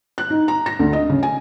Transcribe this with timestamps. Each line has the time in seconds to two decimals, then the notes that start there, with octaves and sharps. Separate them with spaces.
0.18 F#6
0.30 D#4
0.48 A#5
0.66 A#6
0.79 D2
0.93 D#5
1.10 C#3
1.23 G#5